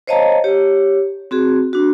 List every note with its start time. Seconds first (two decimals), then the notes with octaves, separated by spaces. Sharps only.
0.07 C5 C#5 D#5 F5 A5 A#5
0.44 G4 C#5
1.31 C4 F#4 G#4
1.73 D4 F#4